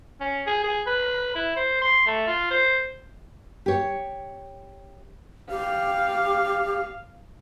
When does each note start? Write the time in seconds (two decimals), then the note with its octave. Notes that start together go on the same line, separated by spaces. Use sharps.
0.20 C#4
0.47 G#4
0.63 G#4
0.87 B4
1.35 E4
1.56 C5
1.81 C6
2.07 A3
2.27 F4
2.50 C5
3.66 G4 C#5
5.51 G4 F5